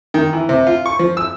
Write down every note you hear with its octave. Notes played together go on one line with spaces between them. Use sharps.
D#3
E3
C3
F4
C#6
F3
E6